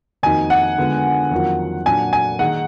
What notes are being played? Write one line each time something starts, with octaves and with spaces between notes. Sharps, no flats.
F2 D#3 A#3 D#4 F#4 G#5
F#5
D3 G#3 B3 F4
F2 D#3 F#3 A#3 F4
A#2 F#3 D4 G#5
G#5
D#3 A#3 D#4 G#4 F#5